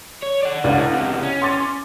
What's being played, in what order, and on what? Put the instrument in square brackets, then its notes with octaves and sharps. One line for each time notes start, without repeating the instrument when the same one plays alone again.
[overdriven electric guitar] C#5
D5 F#5
[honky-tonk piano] C#2 D4 F#5 [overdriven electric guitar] A2
[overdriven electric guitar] E2 C3
C#4
[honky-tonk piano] C6 D6 A6